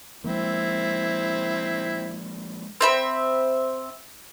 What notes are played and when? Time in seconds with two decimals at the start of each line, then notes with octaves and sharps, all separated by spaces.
0.24 F3 G#3 A#3 C4 E4
2.81 C4 E5 B5